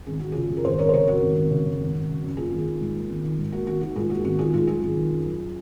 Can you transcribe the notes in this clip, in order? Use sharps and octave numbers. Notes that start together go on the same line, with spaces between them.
G#1 G#4
G#1 F#4
C#3 F4 G#4
F#2
A#4
G#1 G#4 C5
G#1 A#4 C#5
C5
C#3 A#4 C#5
F#2 F#4 A#4
G#1
G#1
C#3
F#2
G#1
G#1
C#3
F#2
A#3 F4 G#4
G#1
D#3
G#2
A#3
G#1
D#3
G#2
A#3 F#4
G#1 F#4
D#3 F#4
G#2 F4 G#4
A#3 F#4
G#1 F#4
D#3 F4 G#4
G#2 F4
F#3 F4 G#4
G#1
D#3
F#2
F#3